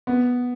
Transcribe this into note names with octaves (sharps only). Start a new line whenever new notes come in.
B3